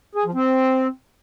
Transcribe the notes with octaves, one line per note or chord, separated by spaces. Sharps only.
G#4
F3
C4